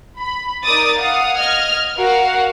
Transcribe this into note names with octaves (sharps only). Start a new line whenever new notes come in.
B5
D#4 A#4 D5 D6 D#6 A6
F5 F#5 D#6
D#5 F6 G#6
F#4 A#4 F5 F#5